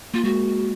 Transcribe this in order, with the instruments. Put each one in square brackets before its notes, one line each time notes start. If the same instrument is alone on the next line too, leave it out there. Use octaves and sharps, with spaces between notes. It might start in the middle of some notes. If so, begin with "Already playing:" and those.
[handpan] A#3 [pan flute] F4
[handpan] G#3 [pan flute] F#4